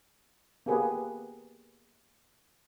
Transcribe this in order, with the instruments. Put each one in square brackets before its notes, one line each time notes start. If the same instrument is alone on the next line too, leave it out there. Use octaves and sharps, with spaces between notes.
[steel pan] A#3 B3 G4 G#4 B4